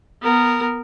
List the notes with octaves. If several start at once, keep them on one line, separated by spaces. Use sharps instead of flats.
B3 A#4